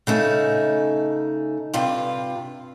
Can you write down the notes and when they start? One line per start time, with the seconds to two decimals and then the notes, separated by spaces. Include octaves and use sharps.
0.07 C#3 A3 D#4
1.74 G2 C3 F4